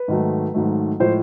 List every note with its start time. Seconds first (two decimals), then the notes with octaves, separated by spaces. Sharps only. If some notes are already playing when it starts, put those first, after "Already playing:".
Already playing: B4
0.08 G#2 D#3 F#3 A3
0.54 G#2 D#3 F#3 A3
1.00 A2 F3 G#3 C5